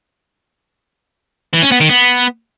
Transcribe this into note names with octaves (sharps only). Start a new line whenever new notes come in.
E3
C#4
B3
D#3
B3